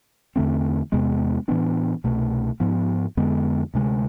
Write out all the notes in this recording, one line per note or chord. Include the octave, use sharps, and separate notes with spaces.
E2 D3 A3 C4
E2 C3 G#3 B3
A2 E3 B3 D4
C2 B2 A3
G#2 F3 B3
F2 D3 G#3 B3
D2 C3 G#3